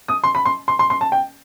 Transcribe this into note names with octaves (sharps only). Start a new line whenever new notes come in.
D#6
C6
B5
C6
C6
C6
C6
A5
G5